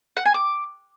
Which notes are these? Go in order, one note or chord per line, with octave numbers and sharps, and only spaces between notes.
F#5
G#5
D6